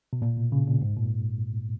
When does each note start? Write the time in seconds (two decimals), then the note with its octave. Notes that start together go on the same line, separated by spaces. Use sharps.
0.13 B2
0.22 A#2
0.37 B2
0.52 C#3
0.67 A#2
0.82 G#2
0.97 A#2